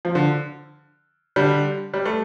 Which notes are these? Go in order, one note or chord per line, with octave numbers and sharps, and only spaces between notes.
F3
D3
D3 G3
G3
A3